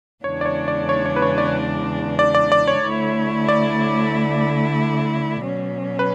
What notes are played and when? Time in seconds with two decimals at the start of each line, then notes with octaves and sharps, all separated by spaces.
0.24 E2 C#3 G#3 D4 C#5
0.41 D5
0.46 C#5
0.68 D5
0.89 C#5
1.06 C#5
1.16 B4
1.22 C#5
1.38 D5
2.19 D5
2.35 D5
2.52 D5
2.68 C#5
2.84 D2 D3 A3 E4
3.48 D5
5.42 B2 F#3 C#4
5.99 B4